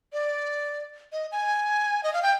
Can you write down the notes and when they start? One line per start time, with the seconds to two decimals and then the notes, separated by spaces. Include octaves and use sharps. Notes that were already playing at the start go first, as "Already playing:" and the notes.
0.13 D5
1.13 D#5
1.32 G#5
2.04 D#5
2.14 F5
2.22 G5